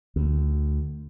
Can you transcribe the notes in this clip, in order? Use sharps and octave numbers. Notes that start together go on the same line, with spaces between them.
D2